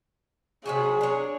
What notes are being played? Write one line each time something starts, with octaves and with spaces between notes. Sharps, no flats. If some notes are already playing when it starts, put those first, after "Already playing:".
C3 F#3 F#4 G#4
D4 C#5